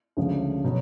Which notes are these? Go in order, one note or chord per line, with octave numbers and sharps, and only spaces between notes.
D2 C#3 F3 G#3
B2 F#3